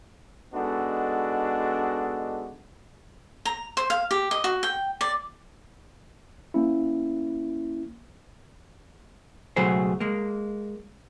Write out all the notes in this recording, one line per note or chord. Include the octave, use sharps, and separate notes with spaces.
G#3 B3 D4 D#4 F#4 A4
A#5
C5
F5
G4
D#5
F#4
G5
D5
A#3 C#4 E4
C#2 B2 F#3 A3 G#4 C5
G#3 A#3